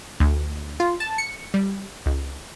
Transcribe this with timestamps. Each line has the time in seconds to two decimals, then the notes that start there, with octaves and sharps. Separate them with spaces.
0.20 D2
0.80 F4
1.00 A5
1.18 C#7
1.54 G3
2.06 C#2